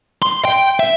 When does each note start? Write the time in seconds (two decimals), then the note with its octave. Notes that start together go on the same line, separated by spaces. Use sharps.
0.22 C6
0.45 G5
0.80 E5